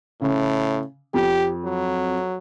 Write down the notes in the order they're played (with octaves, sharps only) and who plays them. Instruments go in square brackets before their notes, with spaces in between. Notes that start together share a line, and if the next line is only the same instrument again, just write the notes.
[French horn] A2 [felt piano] C#3
[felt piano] F2 [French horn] G4
[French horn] F#3